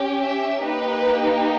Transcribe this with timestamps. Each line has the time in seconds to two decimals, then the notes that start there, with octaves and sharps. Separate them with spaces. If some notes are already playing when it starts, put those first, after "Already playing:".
Already playing: C#4 G4
0.21 E5
0.62 A#3 D#4 G4 B4